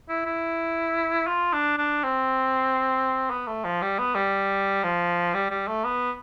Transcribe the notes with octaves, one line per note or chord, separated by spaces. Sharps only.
E4
E4
F4
D4
D4
C4
B3
A3
F3
G3
B3
G3
F3
G3
G3
A3
B3